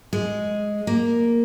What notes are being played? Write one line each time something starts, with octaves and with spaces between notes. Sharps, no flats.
G#3
A#3